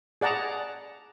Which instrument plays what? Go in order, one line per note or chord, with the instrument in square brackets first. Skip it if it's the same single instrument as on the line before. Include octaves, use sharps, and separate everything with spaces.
[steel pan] G#4 D5 F#5 A5 A#5